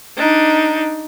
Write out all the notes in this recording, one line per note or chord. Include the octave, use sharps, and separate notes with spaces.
D4 D#4